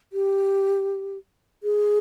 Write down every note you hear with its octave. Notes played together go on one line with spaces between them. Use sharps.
G4
G#4